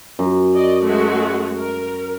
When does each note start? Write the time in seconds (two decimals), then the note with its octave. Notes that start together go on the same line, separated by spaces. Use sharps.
0.19 F#2
0.55 D5 D#5
0.84 G#3 A3 F#4
1.58 A#4